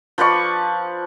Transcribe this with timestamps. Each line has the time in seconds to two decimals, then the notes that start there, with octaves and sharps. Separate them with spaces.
0.18 F3 B4 D5 C#6